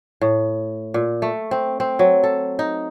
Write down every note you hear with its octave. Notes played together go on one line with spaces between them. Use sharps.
A2
A#2
A3
C4
C4
F#3
A4
D#4